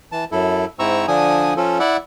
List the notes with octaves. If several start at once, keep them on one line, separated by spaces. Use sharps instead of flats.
E3 A5
F#2 E4 A4
G#2 C4 E4 A#5 C#6 E6
D3 F3 D4 G#5 D#6
F3 C#4 F4 A4
E4 D5 E5 F#5